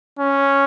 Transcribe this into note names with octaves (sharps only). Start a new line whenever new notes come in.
C#4